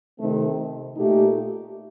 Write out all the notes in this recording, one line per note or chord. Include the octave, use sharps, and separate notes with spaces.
C3 D#3 A3 C4
A#2 A3 D#4 G4